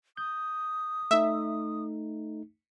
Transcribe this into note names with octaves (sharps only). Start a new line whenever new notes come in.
D#6 G6
A3 D#4 E5